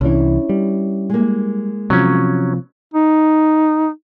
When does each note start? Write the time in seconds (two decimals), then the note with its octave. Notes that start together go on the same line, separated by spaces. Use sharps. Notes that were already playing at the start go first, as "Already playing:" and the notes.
0.01 C2 E3 C#4 D4 E4
0.49 G3
1.10 G#3 A#3
1.90 C3 F3 F#3 C#4
2.94 D#4